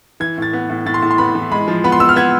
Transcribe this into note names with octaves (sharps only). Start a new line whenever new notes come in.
E3 G#6
A2 A6
B3
A2
A2 A6
C6
A2
C6
B3 B5
E3
G#3 B5
F3
B3 B5
C6
B3 E6
F6
B3 G#6